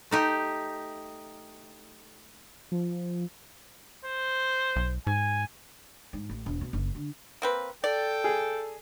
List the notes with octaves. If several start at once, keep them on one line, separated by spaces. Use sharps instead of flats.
A3 D#4 G4
F3
C5
B1
G#2 G#5
G#2
A1
E1
B2
F#1
D3
A#3 C4 B4
A4 D5 G5
G#4